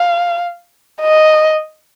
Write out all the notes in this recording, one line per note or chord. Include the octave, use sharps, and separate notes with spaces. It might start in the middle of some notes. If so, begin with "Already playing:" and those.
Already playing: F5
D#5